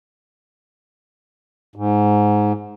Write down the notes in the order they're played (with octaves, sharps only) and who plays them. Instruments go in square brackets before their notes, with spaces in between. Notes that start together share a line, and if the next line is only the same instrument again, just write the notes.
[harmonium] G#2